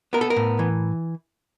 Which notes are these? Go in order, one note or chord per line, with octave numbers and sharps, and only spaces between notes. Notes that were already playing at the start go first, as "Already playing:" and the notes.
B3 A#4
A4
A#4
A2
E3